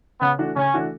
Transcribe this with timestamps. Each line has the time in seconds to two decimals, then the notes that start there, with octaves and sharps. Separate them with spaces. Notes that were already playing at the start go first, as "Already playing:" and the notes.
0.20 C#3 B3
0.38 E3 A3 D4 F#4
0.56 C#3 C#4
0.74 E3 A3 D4 F#4